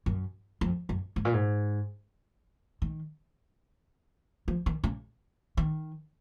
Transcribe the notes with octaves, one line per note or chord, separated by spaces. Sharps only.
F#2
F2
F#2
G#2
A#2
G#2
D#3
F3
D#3
C#3
D#3